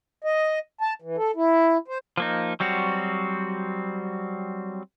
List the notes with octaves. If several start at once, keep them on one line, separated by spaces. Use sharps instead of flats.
D#5
A5
E3
A4
E4
C5
F3 A#3 D#4
F#3 G3 C4 F#4